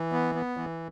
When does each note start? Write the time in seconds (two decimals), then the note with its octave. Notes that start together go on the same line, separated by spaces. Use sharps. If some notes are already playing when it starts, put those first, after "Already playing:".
Already playing: E3
0.12 B3
0.35 B3
0.57 E3